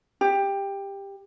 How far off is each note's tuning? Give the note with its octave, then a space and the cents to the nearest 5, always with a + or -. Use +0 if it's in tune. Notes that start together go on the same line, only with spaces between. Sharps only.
G4 +15